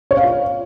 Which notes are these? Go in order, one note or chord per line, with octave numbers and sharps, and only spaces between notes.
C#5
F5
F4